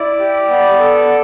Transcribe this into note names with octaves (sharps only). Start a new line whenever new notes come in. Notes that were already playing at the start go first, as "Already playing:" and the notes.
Already playing: E4 D5
G4
B3
A4